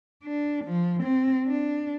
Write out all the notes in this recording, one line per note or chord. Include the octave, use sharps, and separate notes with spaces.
D4
F3
C4
D4